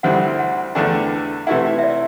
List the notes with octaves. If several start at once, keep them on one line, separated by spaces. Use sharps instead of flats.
D2 D3 G3 C4 E4 F#5
F#5
E2 D3 A3 D4 G5
C3 E3 A3 E4 F#5
E5
D5